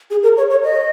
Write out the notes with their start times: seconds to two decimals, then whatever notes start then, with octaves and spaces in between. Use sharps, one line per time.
0.11 G#4
0.23 A#4
0.37 C#5
0.50 C#5
0.64 D#5